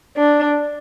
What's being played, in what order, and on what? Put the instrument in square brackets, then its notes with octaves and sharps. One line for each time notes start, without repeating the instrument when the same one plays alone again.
[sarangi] D4